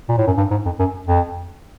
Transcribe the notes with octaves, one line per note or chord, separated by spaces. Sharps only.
A#2
A2
F#2
G2
G#2
F2
F#2
F2